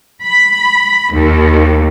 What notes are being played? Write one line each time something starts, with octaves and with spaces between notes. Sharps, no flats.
B5
D#2